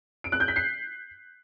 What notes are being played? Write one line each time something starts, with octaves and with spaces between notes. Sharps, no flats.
D7
F#6
G6
B6
C7